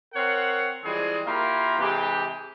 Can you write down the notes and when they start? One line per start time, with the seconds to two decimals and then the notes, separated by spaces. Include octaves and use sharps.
0.14 C4 A#4 C#5 F5 F#5
0.84 E3 F3 G3 G#3 C4 G#4
1.25 A#3 E4 F4 G4 A#4
1.79 C3 E3 G#3 G4